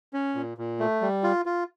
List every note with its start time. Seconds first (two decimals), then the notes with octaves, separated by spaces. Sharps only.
0.13 C#4
0.35 A#2
0.58 A#2
0.80 A3
1.01 G3
1.23 F4
1.46 F4